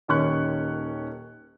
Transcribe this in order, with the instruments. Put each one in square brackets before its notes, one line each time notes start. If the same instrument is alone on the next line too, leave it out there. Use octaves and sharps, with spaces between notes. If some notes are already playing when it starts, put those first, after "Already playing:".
[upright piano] D#1 D#3 C#4 C#6 F#6